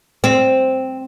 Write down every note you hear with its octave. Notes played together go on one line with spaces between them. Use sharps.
C4